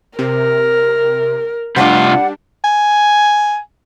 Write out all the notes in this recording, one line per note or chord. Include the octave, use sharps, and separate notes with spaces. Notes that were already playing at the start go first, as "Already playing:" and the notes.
C3 A#4
C3 G3 D4 F4 F#5
G#5